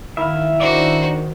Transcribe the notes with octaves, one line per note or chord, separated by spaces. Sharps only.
D#3 E4 E5 F5
D4 D#4 F#4 C5 D5